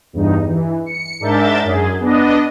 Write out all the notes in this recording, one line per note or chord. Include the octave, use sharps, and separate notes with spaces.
E2 G2 D#4
E3
C#7
G#2 D4 A#4 E5 G6 A6
F#2 G#4
B3 D4 D#5